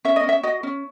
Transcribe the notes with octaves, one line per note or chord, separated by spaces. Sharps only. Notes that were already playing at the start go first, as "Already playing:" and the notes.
C#4 E5
D#5
C#4
E5
F#4 D#5
C#4